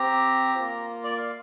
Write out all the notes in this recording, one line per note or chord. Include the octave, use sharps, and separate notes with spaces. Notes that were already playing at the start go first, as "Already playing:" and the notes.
Already playing: C4 G4 A#5
A#3 F4
D5
F5